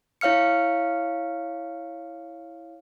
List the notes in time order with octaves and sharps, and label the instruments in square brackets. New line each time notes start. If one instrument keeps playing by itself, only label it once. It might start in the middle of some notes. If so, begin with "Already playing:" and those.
[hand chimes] E4 C#5 F5 F6 C#7